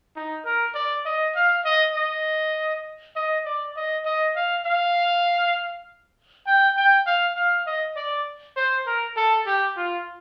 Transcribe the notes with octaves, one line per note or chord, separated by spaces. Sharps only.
D#4
A#4
D5
D#5
F5
D#5
D#5
D#5
D5
D#5
D#5
F5
F5
G5
G5
F5
F5
D#5
D5
C5
A#4
A4
G4
F4